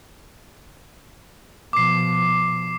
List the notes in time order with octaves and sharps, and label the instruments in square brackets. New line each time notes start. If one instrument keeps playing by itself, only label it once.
[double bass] B2 F3 [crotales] D6 C7